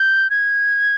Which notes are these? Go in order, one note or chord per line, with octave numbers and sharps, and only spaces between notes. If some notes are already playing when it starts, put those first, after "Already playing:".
Already playing: G6
G#6